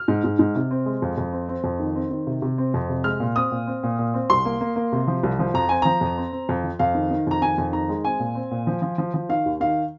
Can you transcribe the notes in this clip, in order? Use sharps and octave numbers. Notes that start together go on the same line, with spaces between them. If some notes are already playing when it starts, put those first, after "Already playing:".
Already playing: F6
G#2
G#2
G#2
C3
C4
G#3
F2
F2
C4
C4
F2
D#3
C4
D#3
C3
C3
C4
F2
C3
G#3 F6
A#2
C4 D#6
A#2
C4
A#2
A#2
C4
C2 C6
A#3
A#3
A#3
C3
F3
C2
F3
F2 A#5
C4 G#5
F3 A#5
F2
C4
C4
F2
F3
F2 F5
D#3
D#3
F2 A#5
D#3 G#5
F2
D#3 A#5
G#3
C4 G#5
A#2
C4
A#2
F3
F3
F3
F3
D#3 F5
D#2
D#3 F5